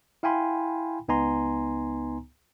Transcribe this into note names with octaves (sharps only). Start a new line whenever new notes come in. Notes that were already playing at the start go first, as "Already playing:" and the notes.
E4 F5 G5 G#5 B5 C6
C#2 B3 D#4 G#5 A#5 C6